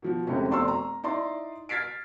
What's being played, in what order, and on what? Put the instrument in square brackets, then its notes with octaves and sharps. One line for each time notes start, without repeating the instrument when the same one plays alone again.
[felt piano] B2 F3 F#4
F1 G#2 C3 C#4
F1 B2 D5 C6 C#6 E6
A#5
D#4 E4 D5 C6
F6 G#6 A6 B6 C7 D7